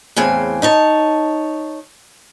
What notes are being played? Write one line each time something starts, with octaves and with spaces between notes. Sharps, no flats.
E2 A2 C#3 C4 G#5
D#4 C#5 A5